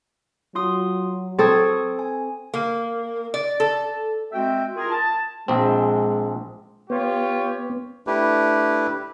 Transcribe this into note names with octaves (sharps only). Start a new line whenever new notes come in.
F#3 F4 C6 D#6
C4 A4 C#6 D#6 G#6
G#5
A#3
D5
A4
G#3 C4 F#4 E5 G5
E4 F4 G#4 A#4
A5
A#1 G#3 C4
B3 F4 G4 C#5
A3 D4 E4 G4 B4